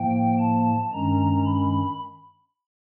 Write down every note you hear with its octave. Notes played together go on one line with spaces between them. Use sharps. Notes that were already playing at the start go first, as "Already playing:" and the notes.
Already playing: A2 F3 A#3 G5
A5
G2 D#3 G#3 C#4 A#5
B5